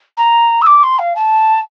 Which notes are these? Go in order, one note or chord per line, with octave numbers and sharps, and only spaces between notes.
A#5
E6
D6
C6
F5
A5